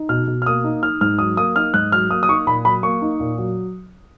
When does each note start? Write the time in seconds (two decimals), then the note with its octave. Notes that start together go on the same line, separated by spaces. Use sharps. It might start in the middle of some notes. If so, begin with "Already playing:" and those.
Already playing: D#4
0.09 B2 F6
0.27 B2
0.42 F6
0.46 A#3 D#6
0.64 D#4
0.83 D#4 F6
1.01 G#2 F6
1.19 F#3 D#6
1.37 A#3 D#6
1.56 D#4 F6
1.74 G#2 F#6
1.92 F#3 F6
2.10 A#3 D#6
2.23 D#6
2.29 D#4 C#6
2.46 A#2 B5
2.65 F#3 B5
2.83 A#3 C#6
3.02 D#4
3.20 A#2
3.38 F#3